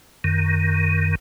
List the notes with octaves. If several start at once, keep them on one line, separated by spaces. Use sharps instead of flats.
F#2 D#3